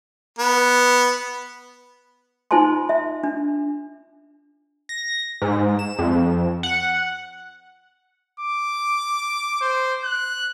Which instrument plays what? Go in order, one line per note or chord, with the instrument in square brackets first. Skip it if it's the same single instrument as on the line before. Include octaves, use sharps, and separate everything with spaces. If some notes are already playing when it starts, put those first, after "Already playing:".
[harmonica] B3
[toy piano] D#4 F4 C5 G#5 A5 C6
E5
D4
[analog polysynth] A#6
G#2
E7
F2
F#5
[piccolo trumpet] D6
C5
F#6